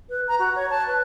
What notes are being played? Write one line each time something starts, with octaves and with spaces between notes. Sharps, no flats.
B4
A#5
F#4
C#5
A5
B4